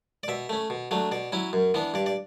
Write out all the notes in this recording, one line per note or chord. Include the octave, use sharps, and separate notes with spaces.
D5
B2 E5
A3 C#4
B2
F#3 A3 D4
B2 D5
F#3 C#4 E4
F#2
E3 B3 D4
G2 D5
D5